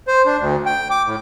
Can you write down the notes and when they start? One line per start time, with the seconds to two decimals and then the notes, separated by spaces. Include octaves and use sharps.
0.08 C5
0.26 D4
0.39 D2
0.66 G5
0.91 D6
1.06 A2